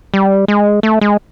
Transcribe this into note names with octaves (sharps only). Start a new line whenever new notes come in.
G3
G#3
A3
G#3